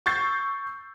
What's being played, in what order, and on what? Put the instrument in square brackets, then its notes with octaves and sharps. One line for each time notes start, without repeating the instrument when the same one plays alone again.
[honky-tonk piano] C#6 E6 G6 A6 C7